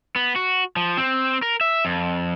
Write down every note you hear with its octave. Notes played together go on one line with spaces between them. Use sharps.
B3
F#4
F3
C4
A#4
E5
F2